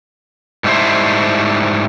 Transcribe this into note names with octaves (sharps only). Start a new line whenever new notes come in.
G#2 G3 A3 E4 C5